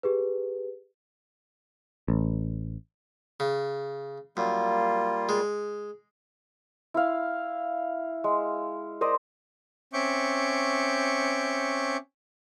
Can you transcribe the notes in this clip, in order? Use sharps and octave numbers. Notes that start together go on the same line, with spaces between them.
G4 G#4 B4
A1
C#3
F#2 G3 A#3 F4
G#3
E4 F5
G#3
A#4 C5 D5 D#5
C4 C#4 E5 C#6 D6 G6